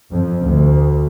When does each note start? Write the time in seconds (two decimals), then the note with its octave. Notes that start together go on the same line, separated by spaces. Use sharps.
0.12 F2
0.42 D2